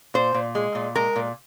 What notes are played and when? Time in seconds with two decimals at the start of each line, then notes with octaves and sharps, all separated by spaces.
0.14 A#2 C5
0.34 A#2
0.55 G#3
0.75 A#2
0.95 G#3 A#4
1.16 A#2